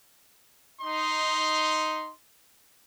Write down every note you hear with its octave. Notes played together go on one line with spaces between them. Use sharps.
D#4 C6